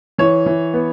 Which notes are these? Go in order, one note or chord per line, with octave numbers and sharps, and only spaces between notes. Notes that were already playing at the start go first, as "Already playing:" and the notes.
E3 C#5
E3
B3